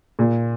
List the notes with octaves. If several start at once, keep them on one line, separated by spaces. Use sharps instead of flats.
A#2